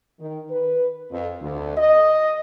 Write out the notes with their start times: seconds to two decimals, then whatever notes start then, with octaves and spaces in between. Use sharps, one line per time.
0.20 D#3
0.50 B4
1.11 F2
1.41 D2
1.77 D#5